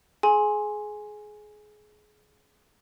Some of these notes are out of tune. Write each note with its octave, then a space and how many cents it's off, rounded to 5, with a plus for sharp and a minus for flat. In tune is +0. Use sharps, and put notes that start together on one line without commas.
G#4 +25 G#5 +0 C6 +15